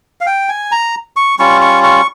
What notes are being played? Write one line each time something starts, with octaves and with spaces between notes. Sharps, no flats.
F5
G5
G#5
A#5
C#6
G3 C#4 F4 C#6
C#6
C#6